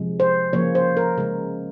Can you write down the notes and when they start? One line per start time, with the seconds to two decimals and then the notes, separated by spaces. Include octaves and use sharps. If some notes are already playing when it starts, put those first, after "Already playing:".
Already playing: C3 F3 G#3
0.20 C5
0.53 C#3 F3 A#3 C#5
0.75 C5
0.97 A#4
1.18 C#3 G#3